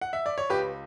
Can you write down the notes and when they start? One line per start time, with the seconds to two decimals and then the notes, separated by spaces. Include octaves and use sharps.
0.01 F#5
0.13 E5
0.26 D5
0.38 C#5
0.49 C#2 G4 B4